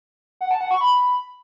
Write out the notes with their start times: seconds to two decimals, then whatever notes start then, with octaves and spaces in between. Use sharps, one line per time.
0.41 F#5
0.51 A5
0.61 F#5
0.71 C#6
0.81 B5